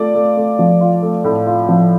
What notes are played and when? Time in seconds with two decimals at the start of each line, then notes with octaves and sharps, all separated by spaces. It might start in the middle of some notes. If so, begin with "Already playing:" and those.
Already playing: A3 F4 D5
0.15 A3
0.37 A3
0.59 F3
0.81 F4
1.02 A3
1.24 A2
1.47 F4
1.69 F3